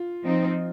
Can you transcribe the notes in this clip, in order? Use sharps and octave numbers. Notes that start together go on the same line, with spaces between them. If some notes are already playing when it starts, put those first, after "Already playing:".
Already playing: F4
F3 C4 D#4